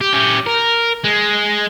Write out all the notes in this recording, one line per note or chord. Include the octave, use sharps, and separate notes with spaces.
G4
C#4 G4
A#4
G#3